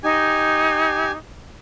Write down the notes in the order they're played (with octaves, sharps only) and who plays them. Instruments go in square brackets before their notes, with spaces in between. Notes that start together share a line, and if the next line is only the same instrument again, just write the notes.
[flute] D#4 [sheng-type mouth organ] G4 G#5